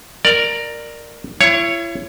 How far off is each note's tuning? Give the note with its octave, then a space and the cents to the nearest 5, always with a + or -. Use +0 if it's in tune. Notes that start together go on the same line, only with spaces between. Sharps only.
A#4 +0 D5 +15
E4 +40 C#5 +0